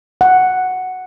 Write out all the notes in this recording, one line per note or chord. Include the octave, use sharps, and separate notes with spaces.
F#5